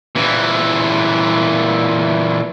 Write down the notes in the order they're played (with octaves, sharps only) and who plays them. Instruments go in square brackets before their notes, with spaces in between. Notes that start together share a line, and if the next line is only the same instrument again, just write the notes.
[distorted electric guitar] A#2 E3